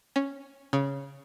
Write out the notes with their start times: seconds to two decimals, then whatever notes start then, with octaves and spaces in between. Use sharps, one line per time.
0.16 C#4
0.73 C#3